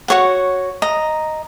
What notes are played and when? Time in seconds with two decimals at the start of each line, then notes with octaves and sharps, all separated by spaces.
0.08 F#4 C#5 F#5
0.82 D#5 A#5